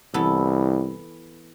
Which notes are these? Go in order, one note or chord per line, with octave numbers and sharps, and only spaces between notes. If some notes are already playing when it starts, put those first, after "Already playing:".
C2 E3 B3 A4